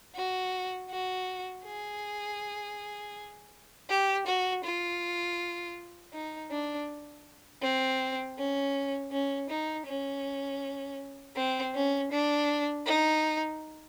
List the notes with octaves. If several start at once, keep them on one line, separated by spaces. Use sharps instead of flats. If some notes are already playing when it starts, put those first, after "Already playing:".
F#4
F#4
G#4
G4
F#4
F4
D#4
D4
C4
C#4
C#4
D#4
C#4
C4
C#4
D4
D#4